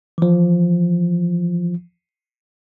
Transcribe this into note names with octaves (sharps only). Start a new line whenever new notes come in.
E3 F3